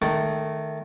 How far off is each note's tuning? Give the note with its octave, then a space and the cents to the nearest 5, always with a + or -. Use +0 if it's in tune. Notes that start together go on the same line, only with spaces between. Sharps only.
D#3 -15 A3 +0